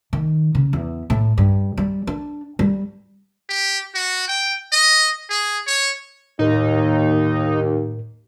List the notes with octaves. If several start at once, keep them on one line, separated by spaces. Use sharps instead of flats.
D#3
C#3
E2
A2
G2
G3
D4
G3
G4
F#4
G5
D#5
G#4
C#5
D#2 A2 D#4 A#4